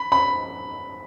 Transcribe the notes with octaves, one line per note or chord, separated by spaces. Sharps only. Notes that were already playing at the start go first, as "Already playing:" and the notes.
Already playing: B5
B5